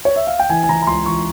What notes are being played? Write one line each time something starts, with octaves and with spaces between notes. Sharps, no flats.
C#5
E5
F5
G5
E3 G#5
G#5
E3 A#5
A#5
C#2 C6
E3 C#6